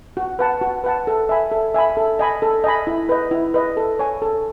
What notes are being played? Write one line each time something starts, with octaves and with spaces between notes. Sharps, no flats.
F#4
B4 F#5 A5
F#4
B4 F#5 A5
A4
E5 G#5 B5
A4
E5 G#5 B5
A4
D#5 G#5 B5
A4
D#5 G#5 B5
E4
B4 D#5
E4
B4 D#5
A4
C#5 G#5
A4